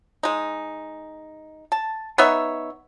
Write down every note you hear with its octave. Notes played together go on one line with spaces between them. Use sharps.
G#3 D#4
A5
B3 D#4 C#5 E5